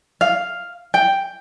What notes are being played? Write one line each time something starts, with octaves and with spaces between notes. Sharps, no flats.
F5
G5